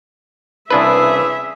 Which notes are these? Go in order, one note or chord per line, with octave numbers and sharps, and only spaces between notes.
C2 C#3 E3 D4 G#4 B4 E5